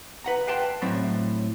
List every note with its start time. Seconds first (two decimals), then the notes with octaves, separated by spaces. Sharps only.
0.24 B4 F#5 A#5
0.47 B4 F5 G5 A5 C6
0.82 A2 F#3 C4 E4 D5 B5